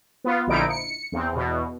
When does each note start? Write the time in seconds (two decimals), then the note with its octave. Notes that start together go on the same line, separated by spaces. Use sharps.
0.24 B3 F4
0.47 A#1 D3 F3 D#4 E4 D7
0.70 C#7
1.12 E2 C4
1.32 E2 B2